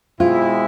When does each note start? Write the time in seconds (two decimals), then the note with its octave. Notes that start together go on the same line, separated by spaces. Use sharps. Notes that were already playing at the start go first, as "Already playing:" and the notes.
0.20 B2 G#3 C4 E4 F4